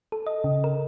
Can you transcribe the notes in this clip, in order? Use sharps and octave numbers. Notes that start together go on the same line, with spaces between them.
A4
D#5
C#3
A#4